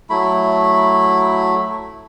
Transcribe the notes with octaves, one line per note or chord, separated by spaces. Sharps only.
F#3 A3 E4 B5